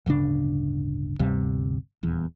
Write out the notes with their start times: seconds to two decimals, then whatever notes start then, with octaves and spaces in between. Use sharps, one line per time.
0.06 D1 G1 C#3 D4
1.19 G1 D2 C3 G3
2.03 D#1 E2